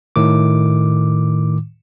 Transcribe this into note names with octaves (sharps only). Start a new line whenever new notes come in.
A2 D#3 D6